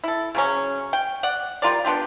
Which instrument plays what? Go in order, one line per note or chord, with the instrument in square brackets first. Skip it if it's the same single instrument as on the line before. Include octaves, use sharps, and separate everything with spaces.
[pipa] E4 A4
C#3 F#3 C#4
G5
D5 F#5
G3 F4 A#4 D5
B3 D4 F4 G4